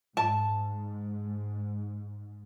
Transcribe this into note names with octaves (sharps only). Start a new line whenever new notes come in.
G#2 A5